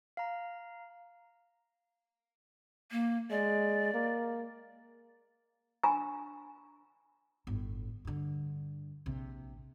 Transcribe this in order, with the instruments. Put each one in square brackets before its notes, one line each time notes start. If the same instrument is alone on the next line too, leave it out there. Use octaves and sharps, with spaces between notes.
[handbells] F5 A#5
[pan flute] A#3
[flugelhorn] G#3 [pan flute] D5
[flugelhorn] A#3
[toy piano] D4 G#5 A#5 B5 C#6
[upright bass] G1 A2
G2 D3
A#1 C3